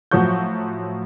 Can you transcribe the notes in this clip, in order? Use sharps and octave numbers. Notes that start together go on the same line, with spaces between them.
A2 F3 F#3 F#4 C#6 G6